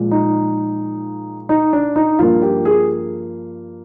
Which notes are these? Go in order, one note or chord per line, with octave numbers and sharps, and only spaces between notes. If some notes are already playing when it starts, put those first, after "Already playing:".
Already playing: A#2 F3 G#3
D#4
D#4
D4
D#4
G2 F3 A#3 F4
G4
G#4